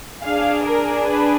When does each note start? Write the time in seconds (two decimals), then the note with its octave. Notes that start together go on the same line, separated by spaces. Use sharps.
0.23 D4 G#4 F5
0.65 A#4
1.08 B4